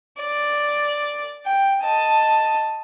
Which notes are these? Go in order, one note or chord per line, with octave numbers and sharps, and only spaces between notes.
D5
G5
D#5 A5